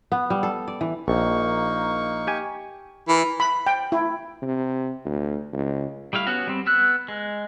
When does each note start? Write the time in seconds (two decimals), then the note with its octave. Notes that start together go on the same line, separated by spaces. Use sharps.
0.12 B3
0.30 G3
0.43 A4
0.68 D5
0.81 E3
1.08 A#1 A#3 D#4 C#6
2.27 G4 G#5
3.08 E3 E4 A#4
3.40 B5
3.67 G5
3.92 E4
4.42 C3
5.05 D2
5.53 C#2
6.13 G3 A3 E4 F5
6.27 B3 C#4 F#4
6.47 G3 C4
6.66 B3 E6 F#6
7.08 G#3